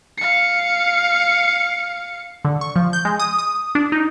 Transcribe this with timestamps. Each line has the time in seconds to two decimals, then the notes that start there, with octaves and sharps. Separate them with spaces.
0.18 F5 C#7
2.45 D3
2.61 C#6
2.76 F3
2.93 G6
3.05 G#3
3.20 D#6
3.38 D#6
3.75 D4
3.92 D#4